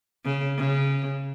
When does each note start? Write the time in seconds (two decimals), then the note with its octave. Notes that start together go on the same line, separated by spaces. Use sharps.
0.25 C#3
0.57 C#3